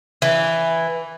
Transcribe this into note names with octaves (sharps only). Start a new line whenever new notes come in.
E3